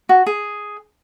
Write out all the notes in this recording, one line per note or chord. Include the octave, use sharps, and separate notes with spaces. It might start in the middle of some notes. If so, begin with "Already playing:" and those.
F#4
G#4